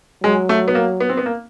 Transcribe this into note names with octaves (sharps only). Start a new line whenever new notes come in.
F#3 G#3
A3
B3
A#3
B3
C4
B3
A#3